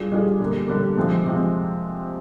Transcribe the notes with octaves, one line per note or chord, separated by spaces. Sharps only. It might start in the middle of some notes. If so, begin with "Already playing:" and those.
Already playing: G3 D4 F4 G#4
G3 D4 F4 G#4
D3 G3 A#3
D3 G3 A#3
C3 F3 G#3 C4
C3 F3 G#3 C4